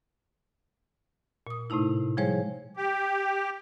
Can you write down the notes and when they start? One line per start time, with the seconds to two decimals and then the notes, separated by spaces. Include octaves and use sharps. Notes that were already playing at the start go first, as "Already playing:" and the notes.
1.47 A#2 D#6
1.70 A2 C3 A3 D#4 E4
2.17 F3 G3 G#3 G#4 C5 C#5
2.77 G4